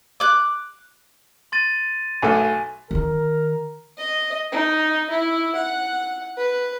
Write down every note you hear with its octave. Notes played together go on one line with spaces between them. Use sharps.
D6 F#6
C6 A6 D#7
B1 A3 A4 G#5
D#3 D#4 A#4
D#5
D#4
E4
F#5
B4